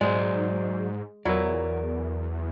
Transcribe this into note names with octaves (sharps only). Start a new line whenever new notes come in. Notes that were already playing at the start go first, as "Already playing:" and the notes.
G#2 F#3 G#3 C5 D5
E2 F#3 E4 A#4 D5